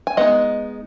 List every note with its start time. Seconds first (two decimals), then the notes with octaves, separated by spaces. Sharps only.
0.07 G#5
0.17 G#3 B3 D#4 D#5 F#5